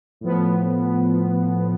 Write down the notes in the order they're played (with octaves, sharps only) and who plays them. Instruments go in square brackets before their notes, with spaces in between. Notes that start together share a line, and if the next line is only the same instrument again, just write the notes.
[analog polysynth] A2 F3 B3